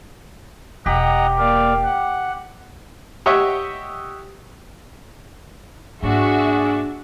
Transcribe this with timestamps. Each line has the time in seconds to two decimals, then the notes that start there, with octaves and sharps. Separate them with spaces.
0.86 E1 G4 D#5 F#5 A#5
1.39 A#3 D5 F5
1.84 F#5
3.26 G4 C#5 D#5 E5 F#5
6.02 G#2 A#3 D4 F#4 G#4 E5